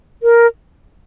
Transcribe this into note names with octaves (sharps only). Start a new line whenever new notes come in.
A#4